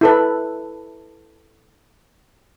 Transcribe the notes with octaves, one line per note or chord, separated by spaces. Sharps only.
E4 A4 B4